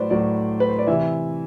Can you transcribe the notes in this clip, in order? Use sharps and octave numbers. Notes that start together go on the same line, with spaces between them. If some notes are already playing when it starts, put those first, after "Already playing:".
Already playing: A2 F#3 B4 C5 D5
A2 F#3 D5
B4
C5
D5
C3 E3 E5